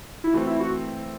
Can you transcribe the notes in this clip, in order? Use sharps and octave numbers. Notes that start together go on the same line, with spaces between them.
E4
E3 A3 C4 F#4
E4
F#4